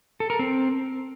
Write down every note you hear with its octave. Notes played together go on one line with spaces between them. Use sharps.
A4
A#4
C4